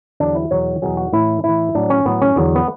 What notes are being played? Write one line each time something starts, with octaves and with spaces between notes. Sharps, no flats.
E2 D3 F#3 D4
E4
E2 B2 F#3 C#5
E2 B2 F#3 G#4
F#4
A2 E3 E4
A2 E3 E4
A2 F#3 D4
C#4
A2 F#3 B3
C#4
E2 D3 F#3
B3